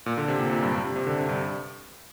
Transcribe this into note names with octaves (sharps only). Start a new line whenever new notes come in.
A#2
D3
C3
A#2
A#2
G2
G2
C3
C3
D3
C3
G2